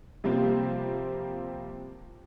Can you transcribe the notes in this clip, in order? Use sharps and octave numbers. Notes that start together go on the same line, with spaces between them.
C3 F3 G3 A#3 C4